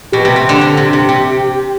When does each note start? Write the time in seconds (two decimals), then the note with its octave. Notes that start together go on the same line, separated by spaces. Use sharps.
0.12 B2 G4
0.25 C3
0.36 C3
0.49 D3
0.61 D3
0.77 C3
0.93 C3
1.09 C3